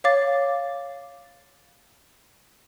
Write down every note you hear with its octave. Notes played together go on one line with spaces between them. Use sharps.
C#5 F5 D6 A6